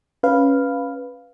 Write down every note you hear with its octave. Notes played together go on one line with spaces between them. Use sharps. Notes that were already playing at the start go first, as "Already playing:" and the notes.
C#4 B4 F5